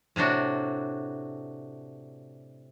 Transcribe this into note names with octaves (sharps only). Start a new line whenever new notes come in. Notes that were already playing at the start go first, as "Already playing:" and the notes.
A2 C3 D4 F#4